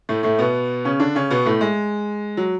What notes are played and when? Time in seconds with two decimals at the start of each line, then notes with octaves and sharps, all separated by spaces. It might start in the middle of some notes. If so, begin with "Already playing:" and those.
0.09 A2 A3
0.23 A2 A3
0.39 B2 B3
0.85 C#3 C#4
1.00 D3 D4
1.15 C#3 C#4
1.31 B2 B3
1.46 A2 A3
1.61 G#3
2.37 F#3